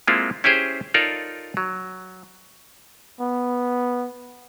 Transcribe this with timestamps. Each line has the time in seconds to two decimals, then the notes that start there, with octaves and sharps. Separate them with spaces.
0.07 G#3 A#3 C4 E4 F4 A4
0.44 C#4 E4 G4 G#4 C5
0.94 D#4 F4 A4 A#4 C#5 D5
1.57 F#3
3.20 B3